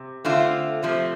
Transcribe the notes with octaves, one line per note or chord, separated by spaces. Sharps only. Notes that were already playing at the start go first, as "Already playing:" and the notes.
Already playing: C3
D3 A3 C4 F4
C3 F3 A3